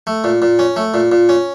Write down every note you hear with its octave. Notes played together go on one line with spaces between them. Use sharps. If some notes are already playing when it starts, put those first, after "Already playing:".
A3
A#2
A#2
C#4
A3
A#2
A#2
C#4